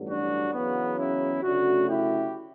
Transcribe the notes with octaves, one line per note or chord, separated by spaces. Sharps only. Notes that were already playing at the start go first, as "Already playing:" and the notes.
Already playing: A1 G2 D3 F#3
D4 F#4
E2 C#3 F#3 B3
C#4 E4
D2 C#3 F#3 A3 D4 F#4
E4 G4